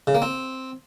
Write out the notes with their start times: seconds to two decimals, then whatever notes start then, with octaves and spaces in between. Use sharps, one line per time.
0.07 C#3
0.15 A#3
0.22 C4